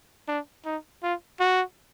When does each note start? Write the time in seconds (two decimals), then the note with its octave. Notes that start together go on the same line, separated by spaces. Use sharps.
0.28 D4
0.65 D#4
1.03 F4
1.40 F#4